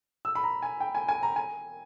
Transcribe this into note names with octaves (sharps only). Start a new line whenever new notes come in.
E6
B5
A#5
G#5
G5
G#5
G#5
A#5
G#5